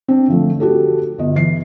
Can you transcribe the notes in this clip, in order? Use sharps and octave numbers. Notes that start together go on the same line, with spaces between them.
C4 D4
D3 F3 A3
F#4 G4 A4
G1 D#5
E3 C7